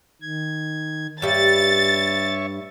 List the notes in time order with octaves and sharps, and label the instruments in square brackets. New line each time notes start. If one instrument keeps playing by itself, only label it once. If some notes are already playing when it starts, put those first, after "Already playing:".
[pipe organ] D#3 G#6
[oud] G2 G3 [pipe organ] C#5 E5 C#6 [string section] A6